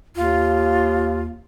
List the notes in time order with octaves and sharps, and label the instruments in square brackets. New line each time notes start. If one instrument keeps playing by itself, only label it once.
[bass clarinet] D#2 [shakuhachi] F4